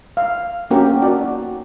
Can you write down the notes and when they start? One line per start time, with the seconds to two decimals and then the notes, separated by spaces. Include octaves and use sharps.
0.17 F5
0.71 A#3 C#4 F#4 G4 A#4
1.02 D#4 F#4 D5 A5